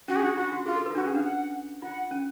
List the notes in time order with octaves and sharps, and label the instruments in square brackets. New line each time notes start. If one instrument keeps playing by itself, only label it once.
[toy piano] C#4 [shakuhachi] F#4
[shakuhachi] G#4
[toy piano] D4 [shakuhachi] F#4
[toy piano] F4 [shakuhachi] F#4
[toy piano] F#4
[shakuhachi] F4 [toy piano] G#4
[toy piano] A4
B4
F4
[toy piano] D4 [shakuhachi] F#4
[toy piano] C#4 [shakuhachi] G#4
[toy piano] D4 [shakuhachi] F5
[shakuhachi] F#5
[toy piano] F4 [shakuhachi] F#5
[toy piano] C#4